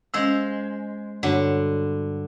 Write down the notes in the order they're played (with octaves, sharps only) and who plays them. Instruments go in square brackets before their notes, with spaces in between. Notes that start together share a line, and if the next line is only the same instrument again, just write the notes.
[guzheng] G#3 C5 F5 [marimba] C#4 E6
[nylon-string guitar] G2 F#4 C#5 [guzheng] D3